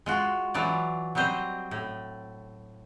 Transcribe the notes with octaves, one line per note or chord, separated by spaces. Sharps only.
G#3 F4 F#4
E3 F#3 F4 D5
F#3 G3 C4 C5 D#5
A2